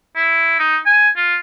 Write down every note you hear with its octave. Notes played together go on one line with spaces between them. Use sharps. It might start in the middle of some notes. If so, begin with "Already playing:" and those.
E4
D#4
G#5
F4